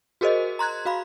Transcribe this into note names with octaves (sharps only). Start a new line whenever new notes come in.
F#4 G#4 A#4 C5 D#5
A#5 C6 F#6 G#6
F#4 F5 B5